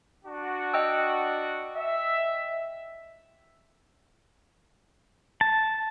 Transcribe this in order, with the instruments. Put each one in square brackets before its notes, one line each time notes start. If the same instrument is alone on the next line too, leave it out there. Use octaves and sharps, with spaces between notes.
[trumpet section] D4 F#4
[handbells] D#5 G5 E6
[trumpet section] E5
[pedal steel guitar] A5